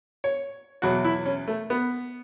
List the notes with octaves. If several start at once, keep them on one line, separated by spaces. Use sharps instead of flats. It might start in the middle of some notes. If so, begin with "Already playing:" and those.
C#5
E2 B2 F#3 F#4
E4
C#4
A3
B3